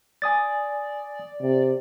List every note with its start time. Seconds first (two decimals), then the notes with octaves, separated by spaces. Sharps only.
0.22 D5 G#5 D#6 A6
1.42 C3